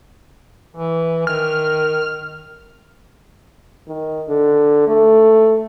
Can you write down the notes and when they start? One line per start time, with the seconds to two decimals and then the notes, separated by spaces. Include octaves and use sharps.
0.77 E3
1.27 D#3 F6
3.88 D#3
4.28 D3
4.87 A3